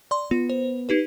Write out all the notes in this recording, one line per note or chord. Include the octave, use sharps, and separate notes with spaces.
D5 C6
B3 F4
C5
D#4 G4 B4